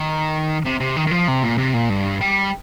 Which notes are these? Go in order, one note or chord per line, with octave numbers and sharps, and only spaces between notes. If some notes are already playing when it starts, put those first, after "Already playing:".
Already playing: D#3
C3
C3
D#3
D#3
F3
C3
A#2
C3
A#2
G2
G3